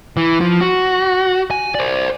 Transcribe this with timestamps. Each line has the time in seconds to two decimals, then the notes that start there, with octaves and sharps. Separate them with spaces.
0.17 E3
0.41 F3
0.61 F#4
1.51 G#5
1.75 C5 D5